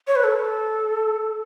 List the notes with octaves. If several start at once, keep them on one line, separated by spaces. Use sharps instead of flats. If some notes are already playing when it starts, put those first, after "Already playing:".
C#5
B4
A4